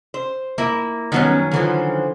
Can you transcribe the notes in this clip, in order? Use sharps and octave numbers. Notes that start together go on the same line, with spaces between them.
C5
A#3 E4
F#2 D#3 F#3 G3 B3 C#4
D3 E3 F3